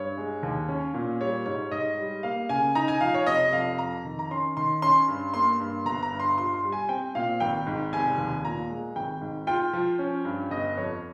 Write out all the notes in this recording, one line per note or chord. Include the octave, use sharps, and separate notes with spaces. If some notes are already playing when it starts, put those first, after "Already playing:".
Already playing: G2 G3 C#5
G#3
D#2
C#4
A#2
G3 C#5
G#2 C#5
G#2 D#5
G3
A#3 F5
C#3 G#5
D#4 A#5
G#5
F3 F5
C#5
F1 D#5
F2 F5
F2 A#5
D#3
A#5
C#4 C6
D#3 C6
C#4 C6
G2
A#3 C6
G2
G1 A#5
A#5
G2
C6
F4 C6
C6
G3
G#5
C4 G5
A#2 F5
G#1 G5
G#2
F1 G#5
D#2
A#2 A#5
G#3
G#1 G5
G#2
F4 G5
F3
C#4
G2
G1 D#5
F2 C#5